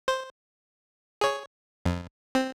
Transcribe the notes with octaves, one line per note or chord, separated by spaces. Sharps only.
C5
G#4 C#5
F2
C4